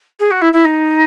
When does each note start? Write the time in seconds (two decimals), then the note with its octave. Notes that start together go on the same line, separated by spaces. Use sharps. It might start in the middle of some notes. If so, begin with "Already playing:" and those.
0.19 G#4
0.31 F#4
0.41 E4
0.53 E4
0.64 D#4